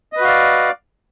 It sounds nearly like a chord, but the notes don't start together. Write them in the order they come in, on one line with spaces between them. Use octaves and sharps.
D#5 B4 F#4 F5 D5